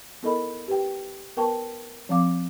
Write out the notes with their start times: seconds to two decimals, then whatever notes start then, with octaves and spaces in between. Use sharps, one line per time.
0.23 B3 E4 A4 A#4 D#5 B5
0.68 G4 B4 G5
1.37 B3 A#4 B4 G5 A5 C#6
2.09 F3 C4 F5 D6